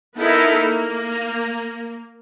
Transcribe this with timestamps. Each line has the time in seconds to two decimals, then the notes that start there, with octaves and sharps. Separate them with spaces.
0.16 B3 D#4 E4 A4 A#4
0.59 A#3